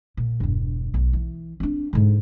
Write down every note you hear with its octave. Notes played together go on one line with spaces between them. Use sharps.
A#2
E1 G2
B1
E3
C4 D4
G#2 D3